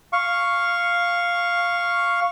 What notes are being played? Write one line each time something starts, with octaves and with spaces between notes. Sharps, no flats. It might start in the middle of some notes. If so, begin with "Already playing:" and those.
F5 C#6